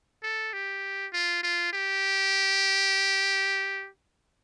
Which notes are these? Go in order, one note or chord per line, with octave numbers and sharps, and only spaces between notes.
A4
G4
F4
F4
G4